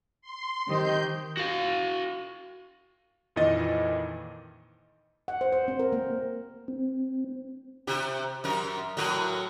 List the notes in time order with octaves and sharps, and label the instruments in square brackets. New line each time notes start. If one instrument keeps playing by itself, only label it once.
[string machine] C6
[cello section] D#3 [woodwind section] C4 G4 D#5 [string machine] G6
[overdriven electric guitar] F#4 F5
[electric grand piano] F2 A#2 D#3 E3 D#5 A6
[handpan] F#5
C5
C5
C4
A#4
A#3
[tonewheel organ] C4
[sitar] C3 G4
F#2 A#4
A2 F#3 A#4